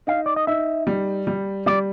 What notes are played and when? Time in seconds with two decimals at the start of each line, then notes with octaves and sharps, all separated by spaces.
0.07 D#4 F5
0.26 D5
0.36 D#5
0.47 D#4 E5
0.87 G3
1.27 G3
1.66 G3 D5